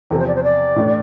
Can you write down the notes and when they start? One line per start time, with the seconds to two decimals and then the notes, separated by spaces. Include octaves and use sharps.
0.11 E2 C3 F3 A4
0.19 C5
0.27 D5
0.36 C5
0.43 D5
0.76 A2 E3 A3 D4